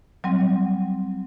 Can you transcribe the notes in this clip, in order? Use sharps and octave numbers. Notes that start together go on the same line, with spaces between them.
F#3 G3 C4